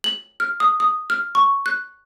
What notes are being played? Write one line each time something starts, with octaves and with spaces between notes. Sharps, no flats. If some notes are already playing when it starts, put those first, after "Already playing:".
F#7
F6
D#6
D#6
F6
C#6
F#6